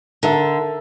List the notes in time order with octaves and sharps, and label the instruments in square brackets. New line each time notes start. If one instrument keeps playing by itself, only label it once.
[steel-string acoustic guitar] D3 [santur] A#4 E5 A5